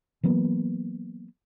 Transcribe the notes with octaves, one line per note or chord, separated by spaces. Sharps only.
E3 F#3 A#3 B3